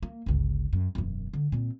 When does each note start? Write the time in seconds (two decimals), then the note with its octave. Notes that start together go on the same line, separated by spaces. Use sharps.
0.03 A#3
0.26 G1 C#2
0.73 F#2
0.95 E1 F#2
1.33 D3
1.52 A#2 C4